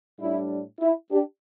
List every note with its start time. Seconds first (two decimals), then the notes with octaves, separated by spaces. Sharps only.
0.18 A2 G3 D4 E4
0.80 E4
1.09 D4 G4